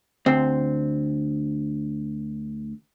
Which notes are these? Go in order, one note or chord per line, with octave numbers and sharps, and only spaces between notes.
D2 C4